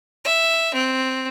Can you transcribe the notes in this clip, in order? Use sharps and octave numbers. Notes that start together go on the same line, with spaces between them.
E5
C4